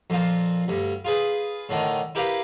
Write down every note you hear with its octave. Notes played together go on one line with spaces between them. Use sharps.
F2 A#2 F4
D2 G2
F4 G#4 B4
A2 D3 D#3
E4 G4 A#4 B4 F5